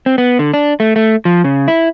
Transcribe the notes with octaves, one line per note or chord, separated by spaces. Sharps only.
C4
B3
D3
D4
A3
A3
F3
C#3
E4